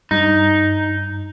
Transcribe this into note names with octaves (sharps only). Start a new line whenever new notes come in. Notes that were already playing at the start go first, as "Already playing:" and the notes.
G2 D#4